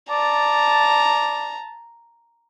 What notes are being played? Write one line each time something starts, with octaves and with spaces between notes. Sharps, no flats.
D5 A5 A#5